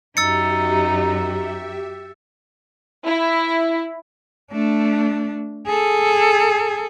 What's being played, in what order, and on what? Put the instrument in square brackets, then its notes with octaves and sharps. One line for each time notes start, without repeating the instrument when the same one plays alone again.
[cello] F#2 F#4 [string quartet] D#4 [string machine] G4 E5 [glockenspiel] E6 A6 C#7
[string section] E4
[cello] A3 D4
G#4 A4